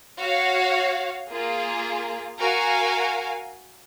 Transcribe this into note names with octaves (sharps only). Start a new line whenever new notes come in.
F#4 C#5 F5
A#3 F4 G#4
F#4 A#4 F5 G#5